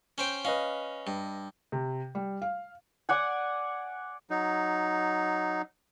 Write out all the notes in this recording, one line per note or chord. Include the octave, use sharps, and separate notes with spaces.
C#4 C5 G5
C#4 B4 D#5 F5
G2
C3
G3
F5
D5 F#5 G#5
F#3 D#4